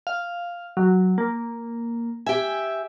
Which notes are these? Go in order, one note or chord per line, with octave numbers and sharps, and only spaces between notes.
F5
F#3
A#3
G4 E5 G#5